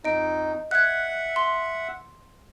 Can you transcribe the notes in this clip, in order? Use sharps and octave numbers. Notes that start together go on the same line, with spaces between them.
F2 D#4 D#5 D7
E5 F#5 F#6 G#6
C6